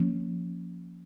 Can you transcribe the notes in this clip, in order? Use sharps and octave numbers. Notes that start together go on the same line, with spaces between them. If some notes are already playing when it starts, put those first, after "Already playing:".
Already playing: F3 A#3 C#4